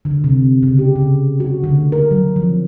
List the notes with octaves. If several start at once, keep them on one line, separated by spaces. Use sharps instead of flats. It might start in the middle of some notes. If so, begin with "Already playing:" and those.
D3
C3
C#3
G4
C#3
F#4
D3
A#4
F#3
F3